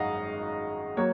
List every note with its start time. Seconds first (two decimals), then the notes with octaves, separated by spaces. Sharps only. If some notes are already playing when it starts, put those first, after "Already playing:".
Already playing: G#1 F#2 D#3 G#3 D#5 F5 F#5
0.97 F#3 A#3 C#5